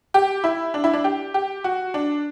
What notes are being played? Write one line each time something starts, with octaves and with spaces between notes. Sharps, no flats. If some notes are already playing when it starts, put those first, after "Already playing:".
G4
E4
D4
E4
D4
G4
G4
F#4
D4